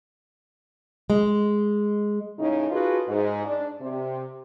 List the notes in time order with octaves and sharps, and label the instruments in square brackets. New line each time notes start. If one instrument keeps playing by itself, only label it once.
[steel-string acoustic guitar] G#3
[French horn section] A2 C#3 D#4
F4 F#4 G#4 A4 B4
G#2
D4
C3